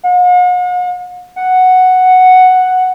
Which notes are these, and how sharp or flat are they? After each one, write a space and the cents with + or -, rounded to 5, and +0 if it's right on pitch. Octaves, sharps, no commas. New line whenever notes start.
F#5 -45
F#5 +0